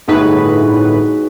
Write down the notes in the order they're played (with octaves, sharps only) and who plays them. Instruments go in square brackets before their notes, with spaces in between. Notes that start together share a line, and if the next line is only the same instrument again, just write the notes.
[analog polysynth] G1 A2 B4 [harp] D#4 F#4 G#4